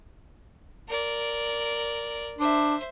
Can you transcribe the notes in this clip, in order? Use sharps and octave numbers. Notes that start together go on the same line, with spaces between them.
A#4 D5
D4 C5 E5